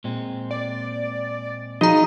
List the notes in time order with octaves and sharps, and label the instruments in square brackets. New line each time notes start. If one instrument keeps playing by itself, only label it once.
[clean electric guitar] A#2 G#3 C4
[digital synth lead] D5
[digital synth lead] F3 [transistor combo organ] D#4 [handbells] F#4 G#4 A#5